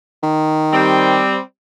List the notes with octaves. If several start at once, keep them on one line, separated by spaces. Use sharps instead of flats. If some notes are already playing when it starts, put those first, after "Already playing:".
D#3
G3 C4